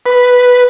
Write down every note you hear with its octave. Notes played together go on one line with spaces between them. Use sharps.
B4